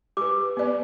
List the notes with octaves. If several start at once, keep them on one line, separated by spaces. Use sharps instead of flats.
G4 B4 D6
B3 B4 D5